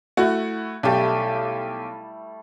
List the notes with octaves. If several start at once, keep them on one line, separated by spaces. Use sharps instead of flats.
A3 E4 F#4 F#5
B1 G3 A3 G4 A5